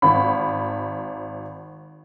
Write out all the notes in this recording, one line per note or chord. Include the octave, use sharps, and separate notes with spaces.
G#1 B5